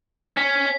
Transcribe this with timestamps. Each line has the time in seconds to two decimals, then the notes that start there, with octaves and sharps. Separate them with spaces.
0.37 C#4 B6
0.54 B6